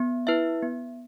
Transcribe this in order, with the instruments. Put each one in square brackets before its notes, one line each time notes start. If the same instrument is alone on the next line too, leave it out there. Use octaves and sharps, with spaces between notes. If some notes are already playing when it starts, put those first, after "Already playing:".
Already playing: [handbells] B3
E4 B4 E5
B3